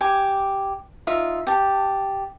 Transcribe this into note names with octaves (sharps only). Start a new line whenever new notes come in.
G4 G#5 D6
D#4 F4 E5
G4 A5